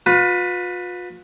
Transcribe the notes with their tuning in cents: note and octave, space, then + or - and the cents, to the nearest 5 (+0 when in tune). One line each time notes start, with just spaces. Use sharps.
F4 +40 B4 +0